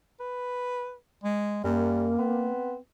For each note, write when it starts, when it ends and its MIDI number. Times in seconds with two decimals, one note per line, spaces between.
0.20 0.95 71
1.24 1.62 56
1.64 2.16 42
1.64 2.08 55
1.64 2.48 58
2.18 2.76 59
2.18 2.78 60